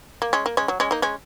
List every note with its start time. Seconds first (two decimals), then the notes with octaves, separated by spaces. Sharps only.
0.22 A#3
0.33 G#3 C#4
0.46 A#3
0.57 G#3 C#4
0.68 F#3
0.80 G#3 C#4
0.91 A#3 D#4
1.02 G#3 C#4